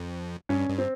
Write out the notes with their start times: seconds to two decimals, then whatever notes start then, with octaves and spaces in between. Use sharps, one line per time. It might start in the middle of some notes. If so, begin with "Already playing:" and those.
Already playing: F2
0.49 G2 C#4
0.69 G2
0.78 C4